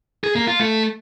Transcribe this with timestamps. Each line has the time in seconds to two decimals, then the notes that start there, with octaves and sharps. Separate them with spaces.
0.24 G#4
0.36 A#3
0.48 F4
0.59 A3